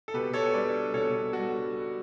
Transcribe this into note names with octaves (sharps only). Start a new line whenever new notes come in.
A4
B2 G4 B4
A4 C#5
G3 D4 B4 D5
B2 A4 C#5
G3 D4 F#4 A4